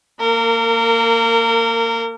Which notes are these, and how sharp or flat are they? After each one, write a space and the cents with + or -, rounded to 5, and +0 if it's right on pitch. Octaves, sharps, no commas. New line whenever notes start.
A#3 -15 A#4 -30